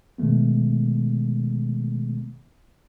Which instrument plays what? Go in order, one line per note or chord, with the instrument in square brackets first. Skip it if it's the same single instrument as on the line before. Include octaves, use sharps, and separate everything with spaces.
[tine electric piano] B2 D#3 G#3 A3 B3